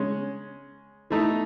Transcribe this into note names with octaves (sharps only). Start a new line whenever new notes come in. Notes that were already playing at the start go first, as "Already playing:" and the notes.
Already playing: C#3 G#3 C#4
E3 A3 D#4